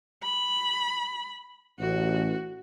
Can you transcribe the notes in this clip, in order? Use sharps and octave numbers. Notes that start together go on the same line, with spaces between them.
B5
A1 F#4